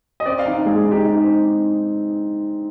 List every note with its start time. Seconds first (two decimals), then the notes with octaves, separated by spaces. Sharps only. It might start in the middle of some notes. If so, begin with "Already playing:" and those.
0.20 D#5
0.26 C4 D5
0.39 F5
0.45 D#4
0.53 F5
0.66 G#3 G#4
0.84 D#4
0.92 G4
1.04 D#4
1.24 C4